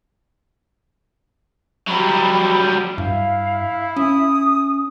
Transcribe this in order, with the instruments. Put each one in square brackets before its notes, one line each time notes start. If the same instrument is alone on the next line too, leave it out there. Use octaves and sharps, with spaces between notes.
[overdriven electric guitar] F#3 G3 [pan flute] B5
[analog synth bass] G2 [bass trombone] E4 [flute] F5
[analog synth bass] C#4 [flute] D#6